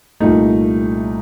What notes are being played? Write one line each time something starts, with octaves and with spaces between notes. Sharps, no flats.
C2 A#2 A3 D#4